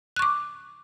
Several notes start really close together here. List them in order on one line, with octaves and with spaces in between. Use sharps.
F#6 C#6 D6